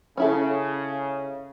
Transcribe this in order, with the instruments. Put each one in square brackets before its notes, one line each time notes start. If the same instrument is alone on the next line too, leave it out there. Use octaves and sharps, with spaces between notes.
[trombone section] C#3 [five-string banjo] C#4 E4 A4